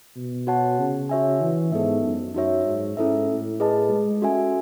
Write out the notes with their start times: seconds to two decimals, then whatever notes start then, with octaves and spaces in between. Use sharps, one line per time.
0.16 B2
0.47 F#4 C#5 F#5 A5
0.79 C#3
1.09 F#4 C#5 E5 G#5
1.42 E3
1.72 G#2 B3 D#4 A4 E5
2.04 F#2
2.34 F#2 D#4 F#4 C#5 E5
2.66 G#2
2.97 G#2 C#4 E4 A4 E5
3.28 A2
3.60 G#4 B4 D#5 A5
3.91 G#3
4.22 C#4 F#4 A4 E5 G#5